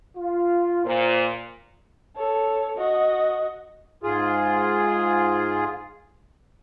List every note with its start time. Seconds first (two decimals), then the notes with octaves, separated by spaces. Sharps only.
0.18 F4
0.85 A#2 C5 F5
2.16 A4 C#5
2.77 F#4 D#5
4.03 G#2 F4 G#4